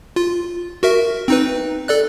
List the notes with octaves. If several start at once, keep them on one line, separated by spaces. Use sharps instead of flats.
F4
F#4 A#4 E5
C4 D#4 B4
A4 D5 F#6